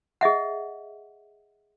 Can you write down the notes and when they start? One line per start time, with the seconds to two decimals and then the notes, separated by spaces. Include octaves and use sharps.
0.21 G#4 D#5 E5 F#5